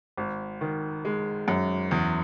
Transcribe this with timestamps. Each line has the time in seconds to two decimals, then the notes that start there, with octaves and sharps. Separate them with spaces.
0.18 G#1
0.61 D#3
1.05 G#3
1.48 F#2
1.91 E2